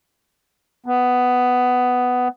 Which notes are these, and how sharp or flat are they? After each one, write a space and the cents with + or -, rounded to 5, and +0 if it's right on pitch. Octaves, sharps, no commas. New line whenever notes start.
B3 +10